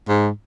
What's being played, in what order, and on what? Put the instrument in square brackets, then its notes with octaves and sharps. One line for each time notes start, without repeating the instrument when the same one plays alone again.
[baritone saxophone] G#2